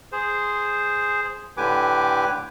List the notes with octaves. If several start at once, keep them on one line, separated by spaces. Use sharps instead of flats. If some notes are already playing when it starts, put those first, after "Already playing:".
G#4 C5
A2 D3 G4 B4 G#5 D6